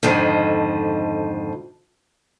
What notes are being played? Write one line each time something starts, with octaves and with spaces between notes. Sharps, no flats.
F2 G#2 D3 D#3 F3